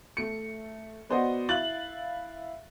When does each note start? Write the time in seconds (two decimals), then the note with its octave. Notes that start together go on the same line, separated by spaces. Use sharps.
0.17 A3 C#7
1.09 B3 F#4 C5 D5 D#5 F#5
1.49 E4 F5 F#6 A6 F#7